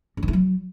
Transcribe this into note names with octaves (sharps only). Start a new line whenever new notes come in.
C#4
D#3
E4
F#3